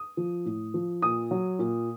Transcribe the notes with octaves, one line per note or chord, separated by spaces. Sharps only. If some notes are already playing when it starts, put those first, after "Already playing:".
Already playing: D#6
F3
A2
F3
A#2 D#6
F#3
A#2